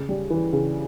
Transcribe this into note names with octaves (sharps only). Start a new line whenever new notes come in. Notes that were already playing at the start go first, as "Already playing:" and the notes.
Already playing: C#3
G3
E3
C#3